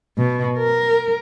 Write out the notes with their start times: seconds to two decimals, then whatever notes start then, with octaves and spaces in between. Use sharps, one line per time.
0.18 B2
0.58 A#4